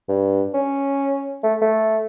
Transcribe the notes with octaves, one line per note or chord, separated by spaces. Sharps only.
G2
C#4
A3
A3